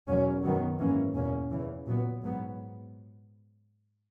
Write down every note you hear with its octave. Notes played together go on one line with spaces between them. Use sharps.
E2 B2 F#3 A#3 C#4
F#2 D#3 F#3 B3
G#2 E3 A#3 C#4
E2 B2 A#3 C#4
E2 C#3 E3
A#2 F#3 B3
G#2 F#3 B3